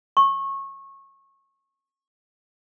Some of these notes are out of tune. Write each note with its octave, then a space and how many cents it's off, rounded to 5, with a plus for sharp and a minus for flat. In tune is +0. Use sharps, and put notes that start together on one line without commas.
C#6 -20